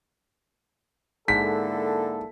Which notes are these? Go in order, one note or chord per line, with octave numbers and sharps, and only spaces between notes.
G#2 D3 A#3 E4 A4 B6